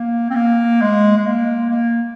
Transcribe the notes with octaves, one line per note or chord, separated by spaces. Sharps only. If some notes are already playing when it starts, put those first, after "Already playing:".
Already playing: A#3
C4
A#3
G#3
G#3
A#3
A#3